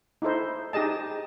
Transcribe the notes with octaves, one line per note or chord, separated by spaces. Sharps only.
D#4 E4 A4 C5
D#4 G4 G#4 D#5 A5